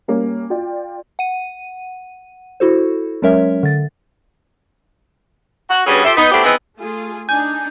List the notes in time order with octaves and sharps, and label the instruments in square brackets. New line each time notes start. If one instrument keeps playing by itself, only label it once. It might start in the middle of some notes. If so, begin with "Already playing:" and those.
[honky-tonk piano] G3 A#3 C#4
F4 D5 G5
[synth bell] F#5 D#7
E4 F#4 A4 C5
F#3 G#3 C#4 A#4 C#5 E5
D3 A6
[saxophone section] F#4
G2 G3 B3 C#4 F#4 G#4
F4 G4 A4 C5 E5
B3 D#4
A3 B3 C4 D4 E4 G4
B3 C4 D#4 E4 G#4 B4
[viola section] A3 F4 G#4
[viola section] D4 D#4 [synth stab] G#5 [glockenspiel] G6